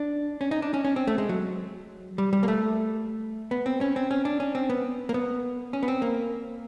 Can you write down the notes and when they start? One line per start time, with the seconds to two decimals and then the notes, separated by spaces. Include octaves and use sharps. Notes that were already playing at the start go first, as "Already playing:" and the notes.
Already playing: D4
0.41 C#4
0.51 D#4
0.62 D4
0.74 C#4
0.85 C#4
0.96 C4
1.07 A3
1.18 G#3
1.29 F#3
2.18 G3
2.33 G3
2.43 A#3
2.48 A3
3.51 B3
3.66 C4
3.81 C#4
3.96 C4
4.11 C#4
4.25 D4
4.40 C#4
4.55 C4
4.69 B3
5.09 A#3
5.14 B3
5.73 C#4
5.83 B3
5.88 C4
6.02 A#3